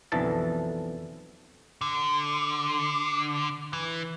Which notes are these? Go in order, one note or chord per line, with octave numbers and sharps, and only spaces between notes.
B1 F2 D3 E3 A4 A5
D3
E3